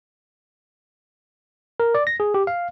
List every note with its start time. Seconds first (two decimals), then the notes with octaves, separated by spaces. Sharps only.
1.80 A#4
1.95 D5
2.07 A#6
2.20 G#4
2.34 G4
2.47 F5